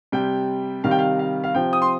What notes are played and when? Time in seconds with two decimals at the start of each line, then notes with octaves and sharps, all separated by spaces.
0.12 C3 G3 G5
0.84 C3 D#3 G3 F5
0.91 G5
0.99 F5
1.19 F5
1.44 F5
1.54 C3 F3 G5
1.73 D#6
1.82 C6